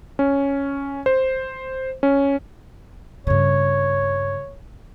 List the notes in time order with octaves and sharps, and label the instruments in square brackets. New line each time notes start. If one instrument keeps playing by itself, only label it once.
[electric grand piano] C#4
C5
C#4
[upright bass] G2 C#3 [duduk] C#5